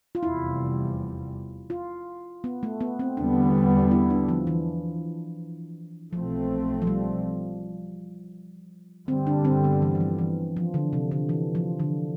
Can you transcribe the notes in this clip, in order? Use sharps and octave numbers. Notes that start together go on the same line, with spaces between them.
F4
F1 E2 C3 G3 E4
F4
B3
A3
B3
C4
E2 D3 G3 B3 D4
E4
D4
F3
E3
B1 B2 F3 A3 C4
F3
G3
G2 D3 G3 C4
D4
C4
B3
E3
E3
F3
E3
F3
D3
C3
D3
E3
F3
D3